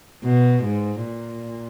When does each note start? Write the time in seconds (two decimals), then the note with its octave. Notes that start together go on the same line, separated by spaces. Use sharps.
0.24 B2
0.63 G#2
1.04 A#2